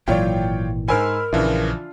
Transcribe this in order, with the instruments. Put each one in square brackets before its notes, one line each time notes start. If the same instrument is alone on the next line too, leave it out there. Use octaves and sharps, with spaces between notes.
[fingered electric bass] G#1 A#2 E3 [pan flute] F#3 [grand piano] F4 C#5 D5 [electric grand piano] G5
[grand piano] G#2 C5 G#5 [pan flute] A#4 [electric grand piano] B5 E6 F6
[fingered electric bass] A#1 [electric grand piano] C#3 E3 F3 [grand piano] D4 F4 E5